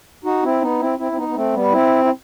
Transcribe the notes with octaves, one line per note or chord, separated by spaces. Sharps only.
D#4 F#4
C4 E4
B3 D#4
C4 E4
C4 E4
C4
B3 D#4
B3
A3 C4
G3 B3
C4 E4
E4